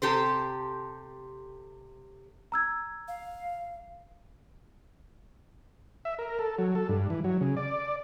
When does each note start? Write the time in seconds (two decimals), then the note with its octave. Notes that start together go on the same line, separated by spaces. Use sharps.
0.02 C3 G4 A4 C5
2.52 A#5 E6 G#6
3.08 F5
6.05 E5
6.19 A#4
6.39 A4
6.59 F#3
6.75 A4
6.89 G2
7.10 E3
7.24 F#3
7.41 C#3
7.57 D5